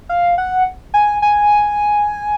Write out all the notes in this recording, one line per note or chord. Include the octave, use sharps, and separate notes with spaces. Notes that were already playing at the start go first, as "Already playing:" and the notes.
F5
F#5
G#5
G#5